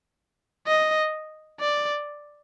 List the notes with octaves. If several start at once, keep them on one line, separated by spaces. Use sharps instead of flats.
D#5
D5